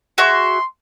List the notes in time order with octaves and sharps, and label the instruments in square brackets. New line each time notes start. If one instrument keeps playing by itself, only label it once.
[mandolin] F#4 G#4 E5 [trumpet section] C6